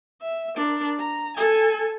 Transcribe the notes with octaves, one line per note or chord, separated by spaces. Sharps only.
E5
D4 A#4
A#5
A4 G#5